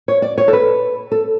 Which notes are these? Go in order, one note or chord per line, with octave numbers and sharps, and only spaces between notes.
C#5
D5
C#5
A4
B4
A4